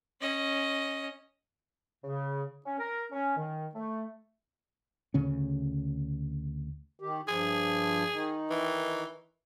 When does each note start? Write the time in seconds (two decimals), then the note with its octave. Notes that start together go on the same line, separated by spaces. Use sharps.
0.20 C#4 D#5
2.04 C#3
2.65 C#4
2.79 A#4
3.10 C#4
3.36 D#3
3.74 A3
5.14 D2 C#3 C#4
7.00 D#3 G4
7.28 G2 F3 G#4
8.13 D#3 D#4
8.50 E3